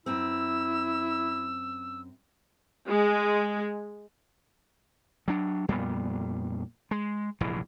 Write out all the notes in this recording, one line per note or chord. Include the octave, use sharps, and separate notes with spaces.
F#2 C4 E4 E6
G#3
F#3 D4
F2 A#2 G3 B3
G#3
F1 A#1 G2 E3